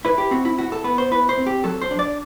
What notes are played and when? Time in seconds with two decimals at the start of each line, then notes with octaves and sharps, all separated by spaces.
0.05 E4 B4
0.18 G4
0.31 C4 F#4
0.45 E4
0.58 E4 F#4
0.72 A4
0.84 B3 B4
0.98 C5
1.11 E4 B4
1.29 C5
1.37 C4
1.46 G4
1.64 F#3 A4
1.82 C5
1.91 D4
1.99 D5